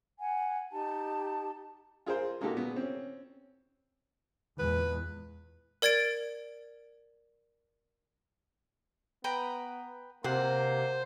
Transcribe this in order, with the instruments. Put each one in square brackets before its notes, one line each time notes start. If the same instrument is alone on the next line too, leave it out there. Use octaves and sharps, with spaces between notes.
[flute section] F#5 G#5
D#4 G4 A5
[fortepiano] F4 G#4 A#4 C5
G#3 A#3 D#4 F#4 G4 A4
A#2 G#3 B3
C4 C#4
[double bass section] E2 A#2 G#3 [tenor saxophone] B4
[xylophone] A#4 D5 G#6 A6 D7
[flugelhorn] B3 [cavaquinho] B4 G5 A#5
[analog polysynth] C3 [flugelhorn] A#3 [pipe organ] C5 [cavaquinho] F#5